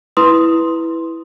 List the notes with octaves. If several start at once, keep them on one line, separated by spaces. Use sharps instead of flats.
E4 B4 C6 D#6